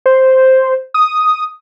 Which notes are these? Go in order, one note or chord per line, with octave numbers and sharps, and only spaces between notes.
C5
D#6